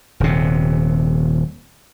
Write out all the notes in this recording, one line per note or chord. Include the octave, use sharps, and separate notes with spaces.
D#1 C3